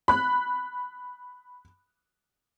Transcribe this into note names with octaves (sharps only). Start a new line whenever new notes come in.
B5 F#6